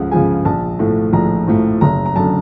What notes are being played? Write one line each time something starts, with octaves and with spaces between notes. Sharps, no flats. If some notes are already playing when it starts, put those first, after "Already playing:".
Already playing: C#2 C#3 F3 G#3 F#5
C#3 F3 G#3 G#5
A#1 A5
A2 F3 A3
A#1 A#5
A2 F3 A3
F#1 A#5
A#5
F#2 D3 A5